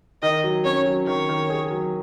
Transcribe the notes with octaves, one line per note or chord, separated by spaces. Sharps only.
D#3 D#5
F#3
C#4 C#5
F#3
D#3 C#5
D#3
G#4
F#3